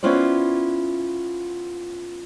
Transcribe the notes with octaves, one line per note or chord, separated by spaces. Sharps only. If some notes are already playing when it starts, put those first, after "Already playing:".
B3 C#4 E4 F4 C5 D5